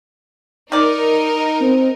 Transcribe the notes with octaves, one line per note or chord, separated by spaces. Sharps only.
D#3 D#4 A#4 D5
C4